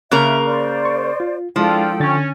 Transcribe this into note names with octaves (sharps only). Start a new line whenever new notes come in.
C#3 A#3 A#4 E5 F#6
C5 D5
C#6
F4
F3 G#3 D4 E4 F4 A4 G5
D3 C#4 A6